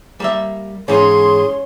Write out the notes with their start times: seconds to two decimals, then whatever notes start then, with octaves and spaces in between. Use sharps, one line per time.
0.20 G3 A#3 E5
0.88 G#2 E3 C#4 G#4 C6